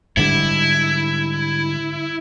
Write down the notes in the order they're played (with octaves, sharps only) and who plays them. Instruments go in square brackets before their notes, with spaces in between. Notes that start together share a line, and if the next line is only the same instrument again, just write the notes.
[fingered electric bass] G#2 D3 G3 [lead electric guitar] E4